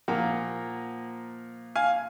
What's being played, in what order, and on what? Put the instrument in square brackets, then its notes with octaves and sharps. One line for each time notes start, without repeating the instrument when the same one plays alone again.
[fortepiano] A#2 F3 A#3 [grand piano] F#5 A#5
[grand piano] F5 G#5